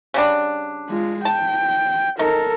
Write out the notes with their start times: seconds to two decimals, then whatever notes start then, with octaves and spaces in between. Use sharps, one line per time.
0.14 C#3 G3 D4
0.89 G#3 F4
1.25 G5 A5
2.19 D#4 A4 A#4